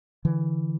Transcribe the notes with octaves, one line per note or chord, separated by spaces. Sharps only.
D3 E3